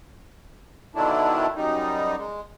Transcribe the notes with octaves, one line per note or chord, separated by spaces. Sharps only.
B2 D3 D#3 F#3 D4 E4
F#2 G3 D#4
G#3